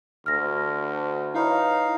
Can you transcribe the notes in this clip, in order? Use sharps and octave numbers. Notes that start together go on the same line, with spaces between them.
D2 F6 A#6
D#4 E4 B4 C#5 F5